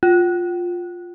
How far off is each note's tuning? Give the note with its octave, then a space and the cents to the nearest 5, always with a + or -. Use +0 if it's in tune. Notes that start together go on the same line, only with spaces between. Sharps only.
F4 +10